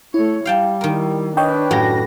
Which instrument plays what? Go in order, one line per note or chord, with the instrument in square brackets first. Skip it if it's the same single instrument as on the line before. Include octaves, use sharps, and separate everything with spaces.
[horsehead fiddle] A3 C#5 [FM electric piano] E4
[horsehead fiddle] G3 [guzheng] F5 G5 A5
[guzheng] D#3 A#4
[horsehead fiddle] D4 B4 [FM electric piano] C#5 D#5 G5
[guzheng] F#2 A2 G4 [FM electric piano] F#4 A#6